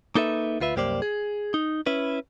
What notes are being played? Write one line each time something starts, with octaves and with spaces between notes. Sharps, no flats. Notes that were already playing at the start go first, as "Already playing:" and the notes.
A#3 D#4 A4 B4 E5
D2 F4 B4 E5
C2 F#2 A#3 G4 C5 D5
G#4
D#4
C#4 E4 B4